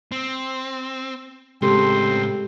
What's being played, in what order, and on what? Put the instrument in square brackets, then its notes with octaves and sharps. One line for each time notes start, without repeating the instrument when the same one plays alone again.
[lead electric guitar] C4
[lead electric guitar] A2 C#3 [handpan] G#3 G4 A4 [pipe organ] C4 C6